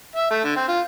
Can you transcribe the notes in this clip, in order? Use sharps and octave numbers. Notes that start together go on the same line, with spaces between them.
E5
A3
D3
C4
F4